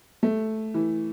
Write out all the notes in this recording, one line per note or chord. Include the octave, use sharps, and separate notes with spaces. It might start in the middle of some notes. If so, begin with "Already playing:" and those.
A3
E3